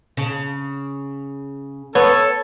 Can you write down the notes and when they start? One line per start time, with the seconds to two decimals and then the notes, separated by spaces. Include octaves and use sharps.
0.17 C#3
1.95 B3 A4 C#5